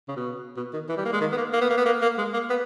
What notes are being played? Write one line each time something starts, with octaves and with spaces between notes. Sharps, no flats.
C#3
B2
B2
D#3
E3
G3
A#3
G#3
D#3
B3
A#3
A#3
B3
A#3
B3
A#3
A#3
G#3
A#3
B3